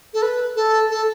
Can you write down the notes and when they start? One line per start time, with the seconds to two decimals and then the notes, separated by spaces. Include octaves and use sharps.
0.14 A4
0.22 B4
0.56 A4
0.90 A4